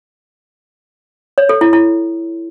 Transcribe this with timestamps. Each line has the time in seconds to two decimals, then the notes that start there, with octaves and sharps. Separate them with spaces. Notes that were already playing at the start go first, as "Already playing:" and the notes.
1.38 C#5
1.49 A4
1.61 E4
1.73 E4